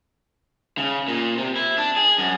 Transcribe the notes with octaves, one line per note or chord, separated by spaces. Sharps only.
C#3
A#2
C3
E4
D4
G#4
F#2